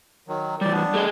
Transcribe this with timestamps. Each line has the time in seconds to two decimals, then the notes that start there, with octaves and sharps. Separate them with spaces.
0.28 D#3 F#3
0.61 E3 G3 D5
0.73 B3 D4
0.94 A3 G#4 D#5